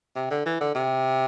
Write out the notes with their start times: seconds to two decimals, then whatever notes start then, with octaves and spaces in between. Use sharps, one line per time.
0.15 C3
0.30 D3
0.45 E3
0.60 D3
0.74 C3